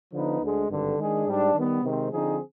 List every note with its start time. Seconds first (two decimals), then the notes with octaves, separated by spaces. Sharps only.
0.13 D3 F3 B3 D#4 B4
0.41 D2 D3 G#3
0.69 G#1 G2 D3
0.98 D#3 G#3 D4 G#4
1.27 G#2 G3 D4
1.55 D#3 G3 B3
1.83 C3 D#3 G#3 C4
2.11 D3 F3 C4 D#4 G#4